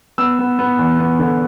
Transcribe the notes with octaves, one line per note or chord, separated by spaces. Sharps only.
B3 E6
B3
B3
E2
B3
D3